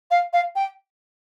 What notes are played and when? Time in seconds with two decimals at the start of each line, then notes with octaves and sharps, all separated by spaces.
0.11 F5
0.33 F5
0.56 G5